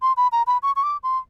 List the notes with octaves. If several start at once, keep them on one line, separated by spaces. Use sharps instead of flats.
C6
B5
A#5
B5
C#6
C#6
D6
C6